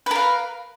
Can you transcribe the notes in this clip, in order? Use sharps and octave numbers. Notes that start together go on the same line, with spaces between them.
A#4 B4 F5